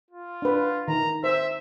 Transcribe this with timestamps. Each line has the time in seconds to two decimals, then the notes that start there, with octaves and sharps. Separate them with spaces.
0.10 F4
0.42 D4 B4
0.88 D#3 A#5
1.24 C5 E5